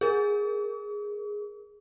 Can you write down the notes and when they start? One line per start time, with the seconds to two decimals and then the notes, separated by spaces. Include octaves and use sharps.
0.01 G#4 A#4